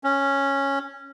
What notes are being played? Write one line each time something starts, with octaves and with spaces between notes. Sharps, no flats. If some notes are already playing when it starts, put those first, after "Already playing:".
C#4